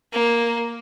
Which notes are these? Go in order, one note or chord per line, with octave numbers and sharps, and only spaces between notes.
A#3